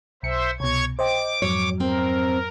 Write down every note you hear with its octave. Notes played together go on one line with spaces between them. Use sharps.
B1 C5 E5 C#7
C2 B2 C#5 C#6 G#6
C5 D#5 G5 D6
F2 G#2 F#3 C#5
C4 A#4